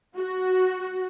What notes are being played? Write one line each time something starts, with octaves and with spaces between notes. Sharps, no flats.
F#4